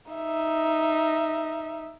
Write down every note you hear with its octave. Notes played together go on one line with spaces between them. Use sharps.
D#4 E5